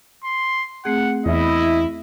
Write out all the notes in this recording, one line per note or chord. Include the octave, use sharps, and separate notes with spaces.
C6
A3 C4 G#4 F#5
E2 E4 D#5